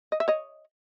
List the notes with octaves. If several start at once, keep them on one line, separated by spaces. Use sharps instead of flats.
D#5
E5
C#5 D#5